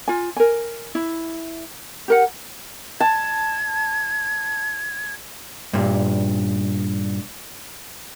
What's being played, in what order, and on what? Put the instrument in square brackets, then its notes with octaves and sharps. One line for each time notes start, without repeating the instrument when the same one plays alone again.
[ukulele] F4 G#5
A#4 G#5
E4
G4 A#4 F#5
[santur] A5 [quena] G#6
[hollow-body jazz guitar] G2 A#2